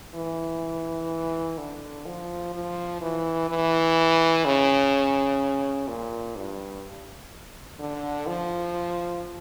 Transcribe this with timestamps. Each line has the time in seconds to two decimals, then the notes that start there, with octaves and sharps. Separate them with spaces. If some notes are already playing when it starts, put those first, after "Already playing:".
0.15 E3
1.58 D3
2.06 F3
2.54 F3
3.01 E3
3.50 E3
4.45 C#3
5.88 A#2
6.36 G2
7.79 D3
8.27 F3